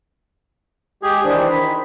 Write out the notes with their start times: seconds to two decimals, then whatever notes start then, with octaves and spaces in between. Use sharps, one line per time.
1.03 G#3 G4 G#4
1.24 D#3 E3 D4 C5
1.50 D#3 B5